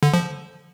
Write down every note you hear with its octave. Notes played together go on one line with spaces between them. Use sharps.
D3
F3